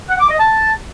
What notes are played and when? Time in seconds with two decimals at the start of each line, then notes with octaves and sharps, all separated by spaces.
0.09 F#5
0.19 D6
0.29 D#5
0.39 A5